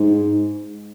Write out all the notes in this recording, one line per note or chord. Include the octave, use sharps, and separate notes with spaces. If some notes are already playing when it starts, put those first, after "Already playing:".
Already playing: G#2